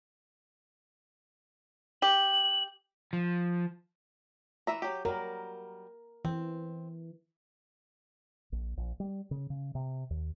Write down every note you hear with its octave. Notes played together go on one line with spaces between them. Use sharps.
G4 F#7
F3
E3 E5 A#5
F#3 G4
F#3 G3 A#4
E3 C4
A#1
A#1
G3
C#3
C#3
C3
D#2